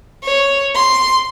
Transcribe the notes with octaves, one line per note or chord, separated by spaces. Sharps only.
C#5
C6